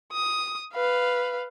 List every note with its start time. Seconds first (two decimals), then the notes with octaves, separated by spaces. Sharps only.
0.12 D#6
0.74 B4 F5